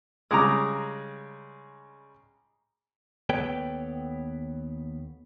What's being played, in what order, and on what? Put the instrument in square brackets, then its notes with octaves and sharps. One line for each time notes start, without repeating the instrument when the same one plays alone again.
[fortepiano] C#3 G3 G#3 [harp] A#5 D6 D#6
[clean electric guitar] D#2 B3 A4 B4 C#5 G5